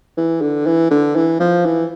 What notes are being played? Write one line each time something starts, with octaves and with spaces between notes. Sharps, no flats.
E3
D3
E3
D3
E3
F3
E3